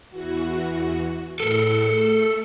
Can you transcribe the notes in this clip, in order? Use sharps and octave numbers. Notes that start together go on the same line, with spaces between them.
E2 E3 F#4
A2 A4 A#4 C#7
A3